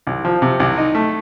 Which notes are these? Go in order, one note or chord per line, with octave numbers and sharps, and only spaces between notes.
C2
F3
C3
C2
D#4
A3